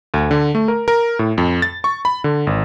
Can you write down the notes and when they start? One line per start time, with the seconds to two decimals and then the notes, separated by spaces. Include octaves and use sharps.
0.14 D2
0.31 D3
0.55 A3
0.68 A#4
0.88 A#4
1.19 A2
1.38 F2
1.62 A6
1.84 C#6
2.05 B5
2.24 D3
2.47 G#1